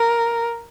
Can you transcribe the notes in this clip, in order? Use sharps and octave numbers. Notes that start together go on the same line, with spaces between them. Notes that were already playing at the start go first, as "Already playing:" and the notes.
Already playing: A#4